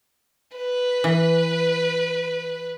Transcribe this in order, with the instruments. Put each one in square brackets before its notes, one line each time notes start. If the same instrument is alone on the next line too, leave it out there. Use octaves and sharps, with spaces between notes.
[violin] B4
[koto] E3